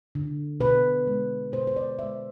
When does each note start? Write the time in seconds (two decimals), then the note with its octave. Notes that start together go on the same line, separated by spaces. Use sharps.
0.15 D3
0.60 B2 B4
1.07 G#3
1.52 B2 C5
1.67 C5
1.76 D5
1.98 G#3 E5